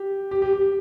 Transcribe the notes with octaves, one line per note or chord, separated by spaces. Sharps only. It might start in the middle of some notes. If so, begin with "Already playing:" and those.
Already playing: G4
G4
G4
G4